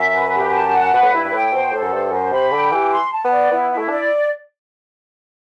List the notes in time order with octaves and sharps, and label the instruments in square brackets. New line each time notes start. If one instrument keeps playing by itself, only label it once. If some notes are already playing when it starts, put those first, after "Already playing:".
Already playing: [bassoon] F#2 [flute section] E5
[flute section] B4
G4
A5
F#5
[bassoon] B2 [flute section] B4
[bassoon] A2
[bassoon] G2 [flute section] E4
[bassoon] G2
[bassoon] A2 [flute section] G5
[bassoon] B2 [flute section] C5
[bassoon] A2 [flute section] A4
[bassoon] F#2
[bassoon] G2 [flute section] C5
[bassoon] F#2 [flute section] C5
[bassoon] C3 [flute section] B5
[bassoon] D3 [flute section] G5
[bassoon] E3 [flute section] G4
[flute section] C6
A5
[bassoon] B3
[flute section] D5
[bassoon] B3 [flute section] E4
[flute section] E4
[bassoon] A3
[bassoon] D4 [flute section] D5